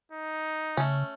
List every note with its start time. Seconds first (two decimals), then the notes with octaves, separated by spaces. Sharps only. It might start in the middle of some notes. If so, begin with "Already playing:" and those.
0.12 D#4
0.77 C#3 A3 C#4